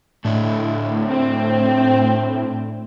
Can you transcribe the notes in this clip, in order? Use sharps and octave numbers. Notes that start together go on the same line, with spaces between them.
A2 A3 D4 E4
C4